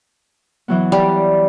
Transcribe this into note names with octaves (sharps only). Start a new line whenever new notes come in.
E3 F#3 B3
G3 D5